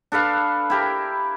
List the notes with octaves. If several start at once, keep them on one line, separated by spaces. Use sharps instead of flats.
D4 A4 B4 F5
E4 G4 A#4